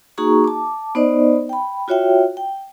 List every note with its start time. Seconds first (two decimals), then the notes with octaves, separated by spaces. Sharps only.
0.18 A#3 D#4 F#4 G#4 A#5 C#6
0.44 A5 D6
0.95 B3 D#4 C5 D5 D#5
1.49 G5 B5
1.88 F4 F#4 C#5 E5 G5
2.37 G5